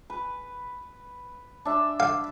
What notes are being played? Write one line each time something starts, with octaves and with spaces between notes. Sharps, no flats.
B4
D4 E5
F5